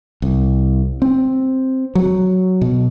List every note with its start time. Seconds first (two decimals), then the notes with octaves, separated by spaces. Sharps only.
0.22 C2
1.02 C4
1.95 F#3
2.61 B2